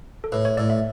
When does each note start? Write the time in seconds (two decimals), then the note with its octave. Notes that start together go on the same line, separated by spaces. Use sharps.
0.24 A4
0.32 A2 B4
0.45 C#5
0.57 A2 D5
0.70 E5